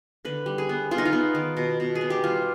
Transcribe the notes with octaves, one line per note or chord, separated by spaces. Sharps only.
D3 B4
G3
G#4
B3
B3 F4
D#4
F4
B3
D#3
B2
B2
G#4
B3
G4
G3 F4